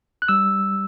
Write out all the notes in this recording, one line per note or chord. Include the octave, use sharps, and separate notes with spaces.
F#6
G3 E6